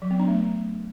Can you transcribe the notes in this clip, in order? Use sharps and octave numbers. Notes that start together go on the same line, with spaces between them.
F#3
B3
D4
A3